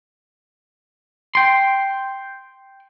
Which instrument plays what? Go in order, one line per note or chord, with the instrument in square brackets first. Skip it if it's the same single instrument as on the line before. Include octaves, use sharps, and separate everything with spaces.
[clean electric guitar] G5 C6